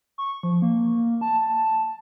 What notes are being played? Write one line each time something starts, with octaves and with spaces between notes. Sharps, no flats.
C#6
F3
A#3
A5
A5